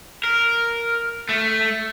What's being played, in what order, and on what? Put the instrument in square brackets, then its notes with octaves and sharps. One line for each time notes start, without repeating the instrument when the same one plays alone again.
[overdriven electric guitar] A#4
A3